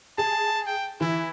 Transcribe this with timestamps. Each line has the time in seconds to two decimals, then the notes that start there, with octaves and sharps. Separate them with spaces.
0.18 G#4 A5
0.66 G5
1.01 E3 E4